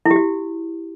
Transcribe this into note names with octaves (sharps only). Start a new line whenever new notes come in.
E4
G4
F#4